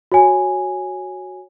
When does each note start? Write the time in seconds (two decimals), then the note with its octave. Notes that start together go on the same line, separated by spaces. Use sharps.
0.12 F#4 C#5 G#5